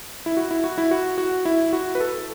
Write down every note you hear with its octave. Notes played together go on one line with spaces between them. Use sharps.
E4
F#4
E4
F#4
E4
F#4
F#4
E4
F#4
B4
A4